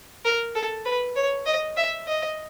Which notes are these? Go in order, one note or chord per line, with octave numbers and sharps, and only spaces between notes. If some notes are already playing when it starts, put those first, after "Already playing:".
A#4
A4
B4
C#5
D#5
E5
D#5